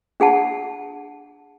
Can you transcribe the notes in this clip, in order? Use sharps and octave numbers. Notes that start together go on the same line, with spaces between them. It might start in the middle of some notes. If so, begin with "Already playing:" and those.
D4 G#4 F#5 A5